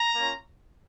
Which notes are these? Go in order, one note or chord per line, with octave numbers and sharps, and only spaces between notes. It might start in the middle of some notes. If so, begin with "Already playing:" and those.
Already playing: A#5
A#3 C#4 F4